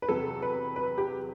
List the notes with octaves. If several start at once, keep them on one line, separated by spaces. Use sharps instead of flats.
B4
E2 C3 F#3 A4
B4
B4
G4